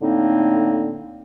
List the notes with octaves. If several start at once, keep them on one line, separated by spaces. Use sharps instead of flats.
A2 D3 A#3 C4 D#4